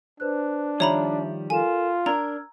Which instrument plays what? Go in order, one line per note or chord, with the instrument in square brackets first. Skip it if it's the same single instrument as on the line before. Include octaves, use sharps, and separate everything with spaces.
[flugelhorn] D4 [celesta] B4 C5 F#6
[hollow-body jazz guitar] D#3 F3 G3 [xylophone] C#5 A#5 B5 [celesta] E5
[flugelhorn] F4 [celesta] A4 A#4 E7 [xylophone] G#5
[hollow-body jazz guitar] D4 A#4 [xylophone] A#5 [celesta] E6 F6 G#6